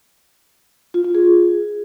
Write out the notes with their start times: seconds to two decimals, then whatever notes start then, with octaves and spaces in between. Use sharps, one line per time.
0.94 F4
1.04 F4
1.15 G#4